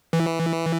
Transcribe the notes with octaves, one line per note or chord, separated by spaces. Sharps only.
E3